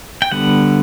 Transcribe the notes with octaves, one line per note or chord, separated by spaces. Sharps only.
G5
D3 G3 B3 F#5